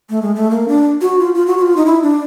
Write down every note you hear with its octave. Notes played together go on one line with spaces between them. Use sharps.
A3
G#3
A3
A#3
D4
F#4
F4
F4
F#4
F#4
F4
D#4
E4
D4